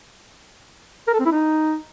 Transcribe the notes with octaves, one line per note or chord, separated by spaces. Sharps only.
A#4
A4
C4
E4
D#4